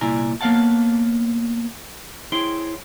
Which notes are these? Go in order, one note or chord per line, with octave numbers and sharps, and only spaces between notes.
C2 A#2 E4 D5 G#5 A#5
A#3 B3 C#5 F5 F#5 A5
E4 G#4 C5 C#5 G5 C6